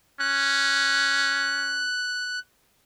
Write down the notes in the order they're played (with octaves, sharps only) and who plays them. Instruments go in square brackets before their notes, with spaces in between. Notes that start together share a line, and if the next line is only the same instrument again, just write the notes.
[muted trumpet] C#4 [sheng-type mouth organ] F#6